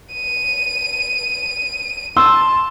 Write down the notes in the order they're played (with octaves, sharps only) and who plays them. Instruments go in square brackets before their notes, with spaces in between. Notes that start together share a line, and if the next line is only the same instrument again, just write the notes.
[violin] D#7
[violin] A5 [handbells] C6 [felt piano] E6